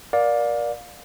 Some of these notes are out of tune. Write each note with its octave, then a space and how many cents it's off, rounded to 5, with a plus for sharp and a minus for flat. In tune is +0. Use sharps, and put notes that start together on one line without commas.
A#4 +30 D5 +0 F5 +25